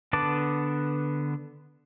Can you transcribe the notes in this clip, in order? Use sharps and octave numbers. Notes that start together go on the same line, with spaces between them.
D3 B3 B4 A5 D6